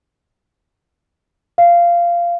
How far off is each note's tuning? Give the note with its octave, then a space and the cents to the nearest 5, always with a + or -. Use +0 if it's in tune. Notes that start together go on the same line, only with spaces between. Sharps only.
F5 -15